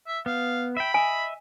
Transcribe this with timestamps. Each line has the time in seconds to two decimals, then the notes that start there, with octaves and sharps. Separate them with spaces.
0.07 E5
0.26 B3 F5
0.77 E5 G5 B5
0.94 D#5 E5 G#5